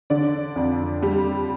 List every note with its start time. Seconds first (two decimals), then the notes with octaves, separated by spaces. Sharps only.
0.10 D3 D5
0.56 F2
1.02 G3